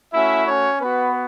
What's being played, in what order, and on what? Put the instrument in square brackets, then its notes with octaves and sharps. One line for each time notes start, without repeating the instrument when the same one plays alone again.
[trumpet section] A3 C#4 E4 F#4 E5
C#4 C#5
B3 F#4 B4